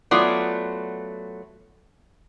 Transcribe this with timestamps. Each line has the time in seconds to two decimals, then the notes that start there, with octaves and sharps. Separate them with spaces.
0.11 F#3 A3 B3 F4 D5